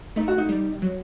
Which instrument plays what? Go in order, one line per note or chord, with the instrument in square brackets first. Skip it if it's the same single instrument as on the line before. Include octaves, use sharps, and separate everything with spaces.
[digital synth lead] A3 [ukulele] D#4
[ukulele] F#4
D#4
[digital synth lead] G3
F#3